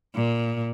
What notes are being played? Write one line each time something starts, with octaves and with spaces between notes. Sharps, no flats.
A#2